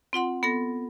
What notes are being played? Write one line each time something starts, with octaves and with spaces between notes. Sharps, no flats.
C4 F4 F#5 C6
B3 A4 A#6